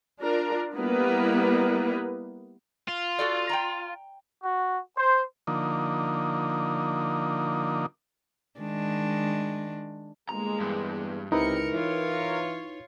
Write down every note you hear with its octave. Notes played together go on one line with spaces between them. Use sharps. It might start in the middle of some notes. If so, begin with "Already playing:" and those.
D4 F4 A#4
G3 A#3 B3 E4 A#4 B4
F4
F#4 A4 D5
G5 A5 A#5
F#4
C5
D3 F3 A#3 D#4
D#3 G#3 D4
G1 G#3 A#3 A#5
E2 G2
C#2 C3 D#4 E4 A#4 B4 C#7
E3 F4 C#5